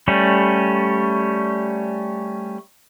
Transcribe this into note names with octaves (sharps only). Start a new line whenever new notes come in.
G3 A3 C#4